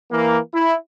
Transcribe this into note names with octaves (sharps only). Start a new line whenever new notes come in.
E3 A#3
E4